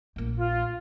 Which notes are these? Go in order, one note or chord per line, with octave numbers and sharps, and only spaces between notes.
A#1 A#3
F4